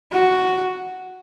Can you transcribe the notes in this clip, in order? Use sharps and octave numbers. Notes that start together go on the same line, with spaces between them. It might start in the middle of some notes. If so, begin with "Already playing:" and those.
F#4